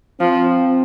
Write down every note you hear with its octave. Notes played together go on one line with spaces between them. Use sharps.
F3 C4